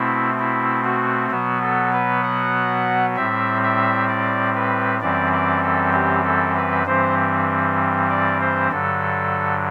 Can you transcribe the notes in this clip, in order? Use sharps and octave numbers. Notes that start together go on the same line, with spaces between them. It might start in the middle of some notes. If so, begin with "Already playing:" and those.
Already playing: B2 A3 C4 E4
E4
F#4
B2 F#3 B3 F#4
A4
B4
F#5
A2 G3 C4 E5
E5
D5
B4
F#2 E3 G3 C4 D5
D5
A4
G4
A4
B4
G2 E3 G3 C4 C5
D5
C5
G2 D3 F#3 A4